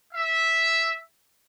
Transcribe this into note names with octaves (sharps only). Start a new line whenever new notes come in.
E5